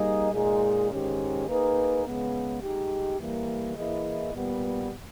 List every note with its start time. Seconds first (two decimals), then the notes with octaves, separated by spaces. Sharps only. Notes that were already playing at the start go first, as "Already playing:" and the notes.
Already playing: G3 A#3 D#4 G#4 D#5
0.33 A#2 G#3 D#4 G#4
0.91 G#2 D#3 G#3 C#4 G4
1.47 A#3 D#4 G#4 B4
2.05 C#3 G#3 B3
2.61 G#3 D#4 G4
3.19 E3 G3 A#3
3.76 E3 A#3 E4 G#4 D#5
4.33 A#2 G3 B3